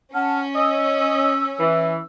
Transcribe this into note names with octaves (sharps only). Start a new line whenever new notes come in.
C#4 F#5 A5 F6
D#5 E6
E3